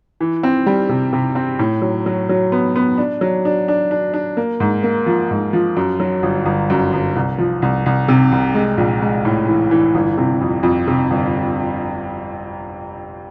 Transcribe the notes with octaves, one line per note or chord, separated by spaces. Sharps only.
E3
C4
G3
C3
C3
C4
A2
F#3
F#3
F#3
B3
B3
D4
F#3
D4
D4
D4
D4
A#3
G#2
A#3
F3
G#2
F3
F#2
F#3
G1
G1
F#2
G1
C2
F3
C2
C2
C3
C2
G#3
A#1
G#3
A2
E3
E3
G1
C3
F2
F2
C3
G1